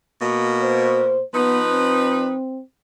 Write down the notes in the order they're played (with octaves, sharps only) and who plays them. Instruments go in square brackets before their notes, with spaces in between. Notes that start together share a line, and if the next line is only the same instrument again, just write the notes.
[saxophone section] B2 A#3
[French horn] C5
[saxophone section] F3 D#4 B4 [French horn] B3
[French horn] C4